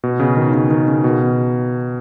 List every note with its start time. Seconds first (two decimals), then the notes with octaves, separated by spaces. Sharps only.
0.03 B2
0.20 C#3
0.37 D#3
0.54 C#3
0.71 D#3
0.88 C#3
1.04 B2